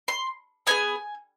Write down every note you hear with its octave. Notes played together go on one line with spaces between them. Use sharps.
C6
B3 D#4 G#4 G#5